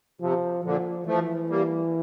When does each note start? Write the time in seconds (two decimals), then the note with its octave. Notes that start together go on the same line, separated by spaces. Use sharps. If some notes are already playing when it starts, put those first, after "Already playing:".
0.21 C3 F3
0.64 A#2 D3 F3
1.07 E3 F3 A3
1.49 G3 A#3